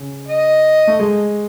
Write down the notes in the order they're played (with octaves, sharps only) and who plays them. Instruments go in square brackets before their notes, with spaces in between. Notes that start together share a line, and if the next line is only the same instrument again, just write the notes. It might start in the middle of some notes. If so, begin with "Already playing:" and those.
Already playing: [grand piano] C#3
[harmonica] D#5
[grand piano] A3
G#3